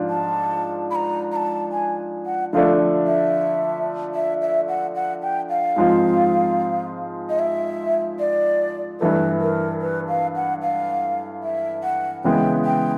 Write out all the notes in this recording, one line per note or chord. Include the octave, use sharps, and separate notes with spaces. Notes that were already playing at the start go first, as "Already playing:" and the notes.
Already playing: G#2 F3 D4 F4
A5
B5
A#5
A#5
A5
G#5
F#5
D3 F3 A3 D4 F5
E5
E5
E5
F#5
F#5
G5
F5
G#2 F3 G#3 C4 F4
D#5
E5
D5
G2 E3 A3 B4
A#4
B4
F5
F#5
F5
E5
F#5
C#3 E3 G#3 B3 G5
G5